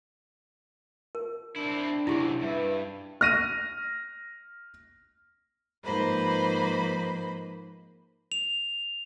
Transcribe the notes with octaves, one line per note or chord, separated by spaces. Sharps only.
A#4
C4 D4 E4
F#2 C3 E4 G4 G#4
G2 B4 E5
F6 A#6 D#7
G#2 F3 A#3 B4 C5 B5
F7